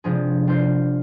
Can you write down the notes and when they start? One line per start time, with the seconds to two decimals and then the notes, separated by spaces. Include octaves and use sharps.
0.04 C3 F3 G#3 D4 G#4
0.47 G3 D4 F4 C5